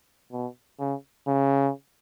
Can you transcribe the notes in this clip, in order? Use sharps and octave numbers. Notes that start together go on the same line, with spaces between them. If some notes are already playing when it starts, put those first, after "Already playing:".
B2
C#3
C#3